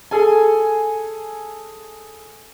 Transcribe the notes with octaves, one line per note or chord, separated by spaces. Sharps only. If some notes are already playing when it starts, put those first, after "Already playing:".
G#4 A4 G#5